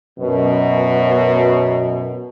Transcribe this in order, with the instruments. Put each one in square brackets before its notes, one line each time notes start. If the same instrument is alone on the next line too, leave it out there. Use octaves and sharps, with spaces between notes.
[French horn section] F#2 B2